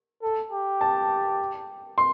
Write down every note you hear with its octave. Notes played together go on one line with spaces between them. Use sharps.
A4
G4
A5
C6